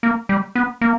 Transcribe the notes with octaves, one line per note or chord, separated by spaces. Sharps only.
A#3
G3
B3
A#3